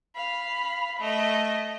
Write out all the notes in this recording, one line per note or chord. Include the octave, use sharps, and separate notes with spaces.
F5 B5
A3 D#5